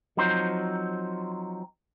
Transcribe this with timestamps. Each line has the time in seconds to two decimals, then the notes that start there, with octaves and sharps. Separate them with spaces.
0.17 F3 F#3 C4 D#4 C5